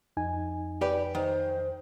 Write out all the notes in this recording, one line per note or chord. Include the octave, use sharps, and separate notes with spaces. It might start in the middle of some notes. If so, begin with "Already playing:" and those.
F2 D#4 G#5
G4 B4 D5
D#3 C5